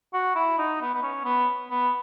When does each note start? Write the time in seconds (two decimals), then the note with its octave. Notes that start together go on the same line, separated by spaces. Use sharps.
0.14 F#4
0.36 E4
0.59 D#4
0.81 B3
0.94 B3
1.03 C#4
1.25 B3
1.70 B3